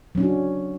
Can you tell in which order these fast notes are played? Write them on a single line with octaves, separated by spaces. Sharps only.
F#3 C#4 D4 F#4